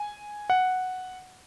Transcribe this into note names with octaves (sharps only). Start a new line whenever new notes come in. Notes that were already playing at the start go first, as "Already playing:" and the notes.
Already playing: G#5
F#5